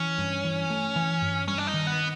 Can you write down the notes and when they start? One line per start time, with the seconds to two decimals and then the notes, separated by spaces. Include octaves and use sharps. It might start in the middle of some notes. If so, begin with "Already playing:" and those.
Already playing: E3 C#4
0.18 G2
0.45 E3
0.70 A3
0.96 E3
1.22 G2
1.48 G3 C#4
1.58 D4
1.67 D#4
1.74 D#3
1.87 B3